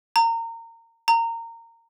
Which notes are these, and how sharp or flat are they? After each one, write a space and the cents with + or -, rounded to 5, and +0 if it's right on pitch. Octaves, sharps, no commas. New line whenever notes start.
A#5 -25
A#5 -20